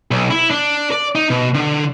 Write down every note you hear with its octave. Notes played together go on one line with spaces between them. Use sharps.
B1
E4
D4
D5
D#4
B2
D3